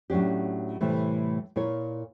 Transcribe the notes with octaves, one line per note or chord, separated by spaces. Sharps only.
A2 F#3 C#4 D4 G4
A2 C3 E3 G3 A3
A#2 E4 A#4 C#5